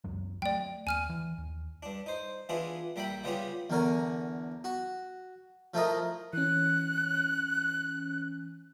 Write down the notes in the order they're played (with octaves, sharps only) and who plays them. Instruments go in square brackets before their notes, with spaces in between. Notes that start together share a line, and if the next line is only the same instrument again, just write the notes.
[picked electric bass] C#2 F#2 F#3
[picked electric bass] F#3 A3 [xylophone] D5 G5
[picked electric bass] D#2 [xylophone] G#5 F6 D#7
[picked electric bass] E3
D#2
[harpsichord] G2 D4
D#4 C5
E3 B3 D4 E4 F4 G#4
A#1 G3 A#4 E5 G5 B5
C#3 G3 B3 F4 G4 G#4
E2 D3 A#4 C#5 G#5
F#4
F3 A3 E4 F4 A#4 D#5
[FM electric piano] E3 C#4 [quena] F#6